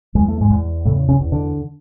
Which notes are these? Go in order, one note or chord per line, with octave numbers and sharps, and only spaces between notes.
E2 G#3
A3
G#2 G#3
E2
A2 C#3 A3
C#3 C#4
E2
D3 D4